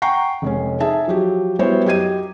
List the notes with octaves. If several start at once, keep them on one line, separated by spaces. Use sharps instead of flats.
F#5 G5 A#5 C#6 C7
F1 G#3 C#4
D#4 G#4 E5 A5
F3 F#3 G4
G3 B3 E4 F#4 C5 C#5
F#2 G4 D#5 G#6 D#7